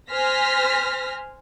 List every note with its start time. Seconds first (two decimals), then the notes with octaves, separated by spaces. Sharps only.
0.11 C5 G#5 F6 A#6 B6